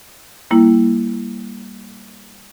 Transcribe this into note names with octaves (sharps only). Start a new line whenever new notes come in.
G3 A#3 E4